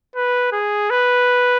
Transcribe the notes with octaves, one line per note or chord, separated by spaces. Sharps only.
B4
G#4
B4